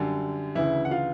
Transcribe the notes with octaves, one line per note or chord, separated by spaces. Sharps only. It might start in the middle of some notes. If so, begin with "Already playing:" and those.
Already playing: F#2 D3 G3
D2 C#3 E3 E4 E5
F#5
F4 F5